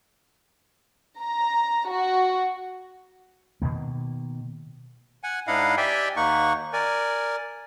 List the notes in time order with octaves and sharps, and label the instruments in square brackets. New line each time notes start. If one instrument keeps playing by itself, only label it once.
[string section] A#5
F#4
[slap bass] B2 D#3 A#3
[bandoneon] F#5 G#5
G#2 D4 E4 D#5 F5 F#5
G4 D5 E5 G5 G#5
D#2 A#3 D#4 F#5 C#6
A#4 D5 G#5